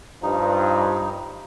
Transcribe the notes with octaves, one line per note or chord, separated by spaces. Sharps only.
G2 F3 D#4